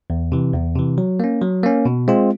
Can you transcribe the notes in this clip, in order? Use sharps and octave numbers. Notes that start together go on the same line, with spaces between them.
E2
C3 E3
E2
C3 E3
F#3
A#3 C#4
F#3
A#3 C#4
B2
G#3 C4 F4